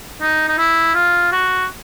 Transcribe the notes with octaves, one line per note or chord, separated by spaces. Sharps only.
D#4
D#4
E4
F4
F#4